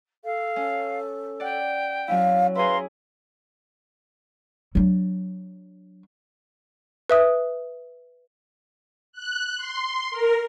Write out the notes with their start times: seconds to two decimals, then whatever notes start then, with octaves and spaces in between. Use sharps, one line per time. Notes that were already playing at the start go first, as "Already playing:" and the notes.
0.24 A4 F5
0.56 C#4
1.40 D5 F#5 G5
2.08 F#3 C#4 E4 F5
2.55 E4 G#4 B4 F5 A#5 C6
4.75 F#3 D4
7.10 B4 E5 D#6
9.13 F#6
9.57 C6
10.11 A#4